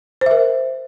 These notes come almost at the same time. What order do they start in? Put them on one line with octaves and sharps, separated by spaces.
C5 E5 A#4